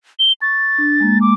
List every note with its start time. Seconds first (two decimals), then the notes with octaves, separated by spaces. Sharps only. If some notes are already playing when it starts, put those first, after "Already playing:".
0.19 G7
0.42 C#6 A6
0.78 D4
1.00 G#3 A#3
1.21 D6